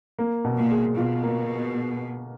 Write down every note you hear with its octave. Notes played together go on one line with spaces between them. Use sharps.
A#3
B2
A#2
G#4
B2 F4
A#3